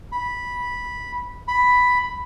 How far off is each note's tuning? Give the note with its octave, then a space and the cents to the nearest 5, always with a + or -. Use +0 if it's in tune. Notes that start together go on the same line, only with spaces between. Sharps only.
B5 -10
B5 +5